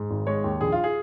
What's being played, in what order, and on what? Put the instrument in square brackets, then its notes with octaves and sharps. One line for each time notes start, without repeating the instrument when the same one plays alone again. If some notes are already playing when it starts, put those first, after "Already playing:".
Already playing: [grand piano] G#2
G#1
G#3 C#5
D#2
A#1 G#4
F4
G#4